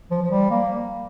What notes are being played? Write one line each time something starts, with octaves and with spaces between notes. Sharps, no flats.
F3
F3
G3
A#3